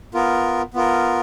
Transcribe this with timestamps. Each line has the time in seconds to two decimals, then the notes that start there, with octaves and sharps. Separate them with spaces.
0.14 B3 F4 A#4
0.74 B3 F4 A#4